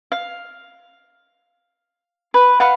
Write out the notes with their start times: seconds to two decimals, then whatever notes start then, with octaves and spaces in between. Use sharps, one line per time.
0.12 F5
2.34 B4
2.60 B4 F5 F#5